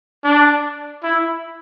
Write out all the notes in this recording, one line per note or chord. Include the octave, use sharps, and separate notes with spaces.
D4
E4